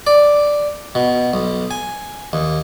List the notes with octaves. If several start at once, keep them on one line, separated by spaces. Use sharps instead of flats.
D5
B2
B1
G#5
D#2